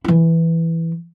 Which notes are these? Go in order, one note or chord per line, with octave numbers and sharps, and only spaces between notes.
E3 E4